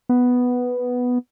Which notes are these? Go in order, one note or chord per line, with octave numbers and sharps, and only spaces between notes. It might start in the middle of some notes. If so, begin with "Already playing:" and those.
B3